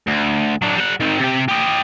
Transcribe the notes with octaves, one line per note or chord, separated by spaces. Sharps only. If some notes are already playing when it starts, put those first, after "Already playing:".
D2
F#3 D4
G3 F#5
D#3 C4
C3 G4
G4 D#5